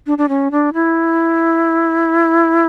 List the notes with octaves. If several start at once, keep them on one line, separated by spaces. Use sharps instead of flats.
D4
D4
C#4
D4
E4